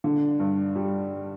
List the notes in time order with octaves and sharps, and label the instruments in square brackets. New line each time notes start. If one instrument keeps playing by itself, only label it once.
[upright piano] D3
G2
G3